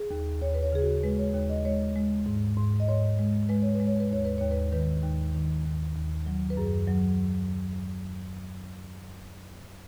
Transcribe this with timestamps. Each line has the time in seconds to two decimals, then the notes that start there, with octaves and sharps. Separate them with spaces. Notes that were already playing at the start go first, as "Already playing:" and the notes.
Already playing: G#4
0.11 D#2
0.41 D#2 C#5
0.54 B4
0.63 C#5
0.73 C#3 G#4
0.82 F#4
1.04 G#3 B4
1.19 C#5
1.34 D#2 C#5
1.49 D#5
1.65 G#3 C#5
1.96 G#3
2.26 G#2
2.57 G#2
2.80 D#5
2.88 G#2 C#5
3.19 G#3
3.49 G#3 B4
3.62 C#5
3.75 B4
3.80 G#3
3.87 C#5
4.00 B4
4.12 D#2 C#5
4.25 B4
4.38 D#2 C#5
4.51 B4
4.72 D#3 B4
5.03 D#2
5.34 D#3
5.65 D#2
5.95 D#2
6.26 F#3
6.50 B4
6.57 F#2 G#4
6.88 F#3